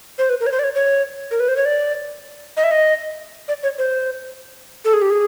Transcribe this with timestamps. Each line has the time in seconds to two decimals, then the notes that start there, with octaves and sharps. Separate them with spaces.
0.19 C5
0.30 B4
0.40 A#4
0.46 C#5
0.52 C5
0.59 D5
0.64 C#5
0.75 C#5
1.31 A#4
1.40 B4
1.48 C5
1.57 C#5
1.65 D5
2.57 D#5
2.64 E5
2.71 D#5
3.48 D5
3.63 C#5
3.78 C5
4.85 A4
4.93 G#4
5.02 G4
5.10 G#4